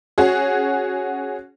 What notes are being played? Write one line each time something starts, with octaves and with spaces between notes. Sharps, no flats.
C#4 F#4 G#4